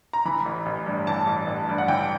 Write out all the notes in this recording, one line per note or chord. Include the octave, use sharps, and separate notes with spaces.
A#5
E3 B5
A1
A1
G2
E3 A5
A1
A1
G2
F#5
E3 G5